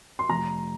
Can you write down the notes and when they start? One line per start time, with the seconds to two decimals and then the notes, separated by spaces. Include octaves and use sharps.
0.19 C6
0.29 F1 A#5